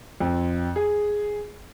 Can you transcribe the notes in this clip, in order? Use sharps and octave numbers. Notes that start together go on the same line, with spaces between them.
F2
G#4